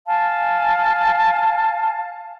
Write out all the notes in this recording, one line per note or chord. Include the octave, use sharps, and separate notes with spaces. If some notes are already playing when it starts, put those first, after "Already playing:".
F5 G#5 A5